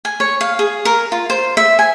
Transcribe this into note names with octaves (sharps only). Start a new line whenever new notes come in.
G#5
C#5
F5
G#4
A#4
F4
C5
E5
G#5